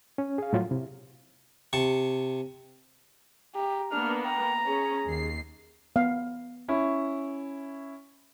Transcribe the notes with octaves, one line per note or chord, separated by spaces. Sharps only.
C#4
G#4 F5
A2 F3 F#3 F4
C3 E4
C3 A5 C#6
G4 A#5
A#3 B3 D4 F6
G5 A#5
C#4 G#4
D#2 C7
B3 F5
C#4 E4